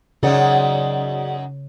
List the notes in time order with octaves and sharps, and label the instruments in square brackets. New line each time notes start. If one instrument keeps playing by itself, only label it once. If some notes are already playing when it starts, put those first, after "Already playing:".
[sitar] F#2 F#3 D#4 [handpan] C#3 C#5 [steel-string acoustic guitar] G#4 D5 F#5